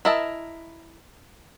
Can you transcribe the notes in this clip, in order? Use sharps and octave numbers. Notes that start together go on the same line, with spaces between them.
E4 A#4 D#5 E5 A5